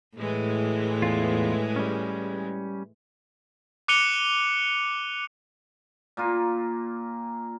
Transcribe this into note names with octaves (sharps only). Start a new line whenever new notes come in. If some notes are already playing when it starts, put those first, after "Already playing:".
A2 E3 G#3
E2 F4
G3 C#4
D6 F#6 C#7 D#7 F7 G7
A#2 A#3 F4